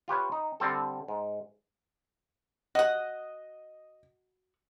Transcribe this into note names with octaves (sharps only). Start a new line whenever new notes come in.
F4 G4 B4 C#5
D#4
D3 G3 C4 A4
G#2
F#4 D#5 F#5